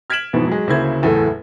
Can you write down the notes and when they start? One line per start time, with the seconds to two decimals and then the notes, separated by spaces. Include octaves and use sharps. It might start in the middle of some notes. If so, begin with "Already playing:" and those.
0.10 F6 G#6 B6 D7 E7 F#7
0.33 F2 G#2 B2 E3 B3
0.48 F#3 G#3
0.67 D2 C#3 A#3 E4 C5 G#6
1.02 F#1 E2 A2 A3 A4